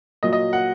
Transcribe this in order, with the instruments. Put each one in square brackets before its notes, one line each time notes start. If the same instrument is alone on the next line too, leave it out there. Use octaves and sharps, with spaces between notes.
[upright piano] A#2 F#3 D#5
D#5
F#5